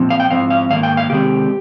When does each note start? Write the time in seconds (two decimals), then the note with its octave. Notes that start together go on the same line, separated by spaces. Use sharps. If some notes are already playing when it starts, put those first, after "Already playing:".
Already playing: A#2 F3 C4
0.10 F5
0.20 G5
0.30 G#2 F3 C4 F5
0.50 F5
0.70 G#2 D#3 A#3 F5
0.83 G5
0.97 F5
1.10 C3 D#3 G#3 C4 G4